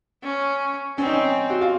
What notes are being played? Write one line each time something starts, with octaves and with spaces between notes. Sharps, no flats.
C#4
C4 C#4
D#4
C#4
F#4
F4